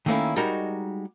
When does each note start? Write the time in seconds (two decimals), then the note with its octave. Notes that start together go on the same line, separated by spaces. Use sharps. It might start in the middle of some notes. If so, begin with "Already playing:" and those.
0.06 D#3 A3 A#3 C#4 E4
0.36 G3 G#3 D#4 F#4 A#4